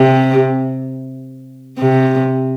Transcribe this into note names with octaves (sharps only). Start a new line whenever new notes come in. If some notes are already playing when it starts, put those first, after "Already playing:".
Already playing: C3
C3